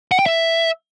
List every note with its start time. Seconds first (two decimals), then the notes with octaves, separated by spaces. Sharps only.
0.12 F#5
0.19 G5
0.26 E5